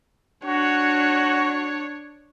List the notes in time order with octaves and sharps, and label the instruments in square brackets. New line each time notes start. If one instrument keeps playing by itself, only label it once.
[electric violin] D4 C#5 [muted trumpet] F#4